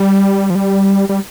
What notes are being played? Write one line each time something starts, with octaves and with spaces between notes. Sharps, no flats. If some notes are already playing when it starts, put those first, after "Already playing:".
Already playing: G3
F3
G3
G3